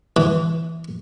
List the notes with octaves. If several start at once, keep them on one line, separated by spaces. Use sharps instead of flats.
E3